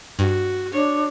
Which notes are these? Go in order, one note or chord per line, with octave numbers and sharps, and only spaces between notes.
G2 F#4
D4 C#5